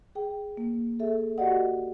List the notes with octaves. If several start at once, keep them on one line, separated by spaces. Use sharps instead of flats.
G#4 G5
A#3
G#4 A4 E5
F#4 G4 D5 D#5 F#5